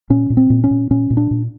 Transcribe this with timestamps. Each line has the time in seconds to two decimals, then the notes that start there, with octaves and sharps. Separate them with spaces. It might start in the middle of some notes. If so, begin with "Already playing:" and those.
0.10 A#2 C#4
0.30 A#2
0.37 C4
0.50 A#2
0.64 C#4
0.71 A#2
0.91 A#2 C#4
1.10 A#2
1.17 D4
1.31 A#2